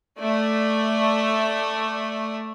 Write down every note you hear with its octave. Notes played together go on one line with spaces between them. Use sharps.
A3 D5